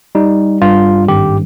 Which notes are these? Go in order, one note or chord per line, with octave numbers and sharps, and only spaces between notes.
G3 D#4
G2 F4
G#1 G4